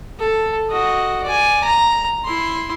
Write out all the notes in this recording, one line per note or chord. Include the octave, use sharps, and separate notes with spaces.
A4
F#4 D#5
D5 G#5
A#5
E4 C6